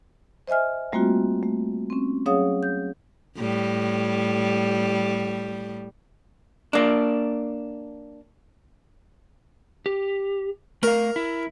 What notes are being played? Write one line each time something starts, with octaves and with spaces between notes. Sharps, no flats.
C5 D#5 E5 G#5 F6
G3 A3 A#3 C4 F4 F#4
A3
C4 C#4
F#3 C#4 G#4 C#5 F5 D#6
G6
A2 G3
A#3 D4
G4
A3 A#4 F5
E4